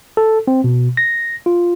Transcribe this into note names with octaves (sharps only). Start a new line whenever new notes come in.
A4
C4
B2
A#6
F4